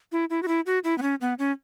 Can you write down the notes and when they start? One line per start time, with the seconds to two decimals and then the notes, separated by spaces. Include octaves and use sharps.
0.12 E4
0.30 E4
0.43 F#4
0.48 E4
0.66 F#4
0.84 E4
0.98 B3
1.02 C#4
1.21 B3
1.39 C#4